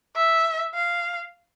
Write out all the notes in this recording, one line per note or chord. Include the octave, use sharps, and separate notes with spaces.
E5
F5